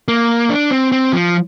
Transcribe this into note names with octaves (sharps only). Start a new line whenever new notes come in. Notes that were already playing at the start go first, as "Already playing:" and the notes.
A#3
D4
C4
C4
F3